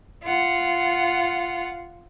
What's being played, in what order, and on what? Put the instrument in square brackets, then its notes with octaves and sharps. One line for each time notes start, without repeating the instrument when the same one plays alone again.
[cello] F4 F#5